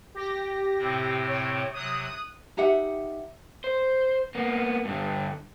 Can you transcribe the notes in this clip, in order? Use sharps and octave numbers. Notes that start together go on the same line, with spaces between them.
G4 A#6
A2 C3 C4
C#5
C3 F#3 D#6 F#6
D#4 G4 E5 F#5
C5
A#3 B3
G2 D3